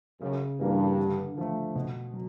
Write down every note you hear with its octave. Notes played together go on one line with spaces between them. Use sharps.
F#2 C#3
G2 E3 G3 A#3 D4
D3
F3 A3
B2
F#3